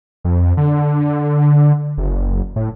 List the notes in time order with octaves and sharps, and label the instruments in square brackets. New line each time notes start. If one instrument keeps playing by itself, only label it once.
[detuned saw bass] F2
D3
F#1
A2